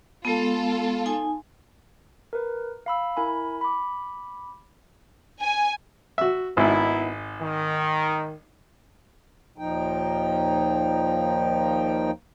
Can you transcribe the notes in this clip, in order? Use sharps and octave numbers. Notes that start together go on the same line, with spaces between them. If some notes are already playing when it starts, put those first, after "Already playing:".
G#3 B3 F4 A4
D#4 G#5
A#4 B4
F5 B5 E6
E4 A#4 G#5 B5
B5 D6
G#5
F#4 E5
G#1 B3 D#4 E4
D#3
D#2 A#2 F3 D#4 G5